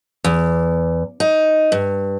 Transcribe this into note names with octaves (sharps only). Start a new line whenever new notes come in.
E2
D#4
G2